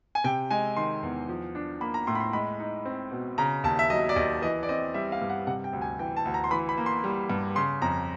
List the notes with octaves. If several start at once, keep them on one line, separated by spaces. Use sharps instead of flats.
G#5
C3 G5
G#3 G#5
D#3 C6
E2
F3
D4
A#3 B5
A#5
A2 C6
B5
C6
G#3 B5
D#4
C4
B2
C#3 A#5
D#2 A5
E5
F#3 D#5
D5
D#2 D#5
E3 D#5
D5
C4 D#5
G3 E5
F5
G2
F#5
C3 F#5
G5
D2
G#5
E3 G5
A5
D2
A#5
C6
E3 B5
B5
A#3
C6
G3
G2
C#3 C6
F2 A#5